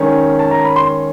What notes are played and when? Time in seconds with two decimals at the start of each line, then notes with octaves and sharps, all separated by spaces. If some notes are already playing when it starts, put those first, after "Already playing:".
Already playing: D#3 G#3 C#4
0.39 A5
0.51 A#5
0.64 B5
0.76 C6